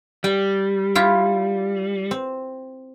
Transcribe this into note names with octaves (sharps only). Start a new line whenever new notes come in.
G3 G5
E4 F4 G4
C4